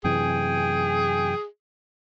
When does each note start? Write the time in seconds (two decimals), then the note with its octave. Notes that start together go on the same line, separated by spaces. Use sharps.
0.04 F#2 C3 E3 G#4 G5 G#5